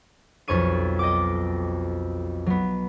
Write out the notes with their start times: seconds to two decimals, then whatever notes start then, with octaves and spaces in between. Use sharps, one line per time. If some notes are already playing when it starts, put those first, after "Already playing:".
0.48 B1 F2 C#5 C#6 D#7
0.99 D#5 G5 D6
2.46 F#3 B3